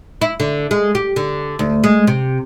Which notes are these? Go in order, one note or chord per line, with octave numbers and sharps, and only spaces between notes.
E4
D3
G#3
G4
D3
D2
G#3
C3